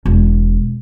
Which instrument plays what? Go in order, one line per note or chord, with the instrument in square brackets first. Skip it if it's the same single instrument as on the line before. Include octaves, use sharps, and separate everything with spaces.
[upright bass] E1